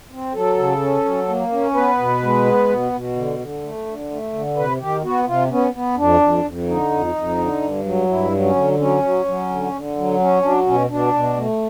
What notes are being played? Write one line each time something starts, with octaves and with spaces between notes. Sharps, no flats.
C4
F#3 A4
C#3
C#4
F#3
A#3
C#4
B3 B4
B2
G#3
B3
B2
B2
D3
D3
A3
D3
A3
D3
C3 B4
D#3 G4
B3 F#4
C3 F4
B3 C#4
B3
F2 D4
F2
F2
D3 D#4
F2
F2
D3
G2
F#3
G2 E4
F#3
C#4
D3
F#3 C#4
F#3
F#3
D3
D3
F#3
C#4
F#3 D4
B2 C#4
B2 D4
B2
A3